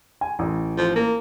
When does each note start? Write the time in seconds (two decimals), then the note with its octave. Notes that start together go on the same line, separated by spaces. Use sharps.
0.21 G#5
0.39 A1
0.78 F3
0.96 A#3